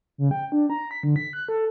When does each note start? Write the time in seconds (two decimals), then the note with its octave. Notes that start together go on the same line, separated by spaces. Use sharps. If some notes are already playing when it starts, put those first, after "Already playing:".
0.18 C#3
0.31 G5
0.52 D4
0.70 A#5
0.91 B6
1.03 D3
1.16 B6
1.33 F#6
1.49 A4